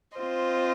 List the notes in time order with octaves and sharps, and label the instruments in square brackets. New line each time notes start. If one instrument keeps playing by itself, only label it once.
[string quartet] C4 F4 C5 D#5